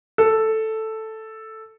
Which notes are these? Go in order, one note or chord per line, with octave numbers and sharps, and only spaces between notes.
A4